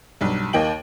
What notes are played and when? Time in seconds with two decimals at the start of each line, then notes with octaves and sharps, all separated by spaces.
0.21 B1 G2
0.53 D#2 A#3 D#5 G5 D7 F#7